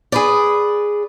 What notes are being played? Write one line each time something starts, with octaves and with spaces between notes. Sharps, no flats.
G#4 B4 D5